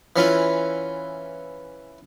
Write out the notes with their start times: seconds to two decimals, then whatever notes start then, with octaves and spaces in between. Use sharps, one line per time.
0.16 E3 C#4 F4